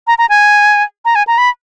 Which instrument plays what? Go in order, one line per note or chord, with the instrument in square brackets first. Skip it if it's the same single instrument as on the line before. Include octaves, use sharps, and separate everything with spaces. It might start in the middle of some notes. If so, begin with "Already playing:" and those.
[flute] A#5
A#5
G#5
A#5
G#5
A#5
B5